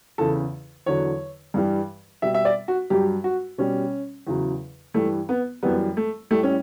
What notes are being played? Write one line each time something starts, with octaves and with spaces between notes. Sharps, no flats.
E2 C#3 E3 A4
E2 D3 F#3 C#5
G2 E3 G3
B2 G3 E5
E5
D5
F#4
G2 F#3 G4
F#4
B2 G3 C#4
E2 C#3 F#3
G2 E3 G3 A3
B3
F#2 E3 G3 B3
A3
A2 G3 A3
C#4